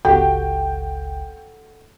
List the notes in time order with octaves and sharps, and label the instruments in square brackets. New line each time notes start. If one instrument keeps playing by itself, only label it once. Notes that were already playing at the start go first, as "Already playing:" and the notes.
[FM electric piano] G1 C#2 [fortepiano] F#4 G4 [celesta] A4 F#5 [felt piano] G5